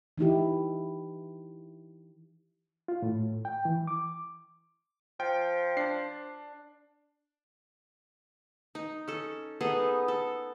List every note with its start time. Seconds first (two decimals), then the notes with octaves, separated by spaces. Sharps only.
0.18 E3 D#4 E4 G4
2.88 F4
3.02 A2
3.45 G5
3.65 E3
3.87 D6
5.20 F3 G5
5.77 D4 C7
8.75 D#4
9.08 C#4 A4
9.61 B3 D#4 G#4 A4
10.08 A4